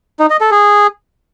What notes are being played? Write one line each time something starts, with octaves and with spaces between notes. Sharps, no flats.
D#4
D#5
A4
G#4